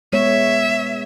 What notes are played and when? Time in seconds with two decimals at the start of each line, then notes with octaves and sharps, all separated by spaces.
0.13 G#3 B3 C#5 E5